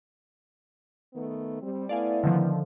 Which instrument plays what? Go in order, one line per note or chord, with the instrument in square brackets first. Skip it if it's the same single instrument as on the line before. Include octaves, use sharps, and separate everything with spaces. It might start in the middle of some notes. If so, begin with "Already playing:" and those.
[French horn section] D#3 A3 B3
G3 C4
[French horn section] A3 B3 E4 [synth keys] D5 F5 G#5
[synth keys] D3 D#3 F3